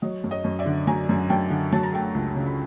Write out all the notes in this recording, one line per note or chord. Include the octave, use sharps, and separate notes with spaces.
F#3 C#5 D#5
F#2
C#5 D#5
F#2
D5 E5
D3
F#3 G#5 A#5
F#2
F#2 G5 A5
D3
F#3 A5
A#5
A3 G5 A5
C#2
C#3
B5